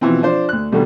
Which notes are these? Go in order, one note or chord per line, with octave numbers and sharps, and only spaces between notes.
B2 E3 F3 C4
F3 D4 C5
D2 F#6
B2 D3 D#3 G3 A3